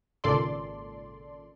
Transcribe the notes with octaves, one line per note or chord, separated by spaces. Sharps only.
G#1 A#2 C#3 A4 D5 C6